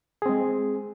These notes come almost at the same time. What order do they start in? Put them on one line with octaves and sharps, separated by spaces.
G#4 C4 G#3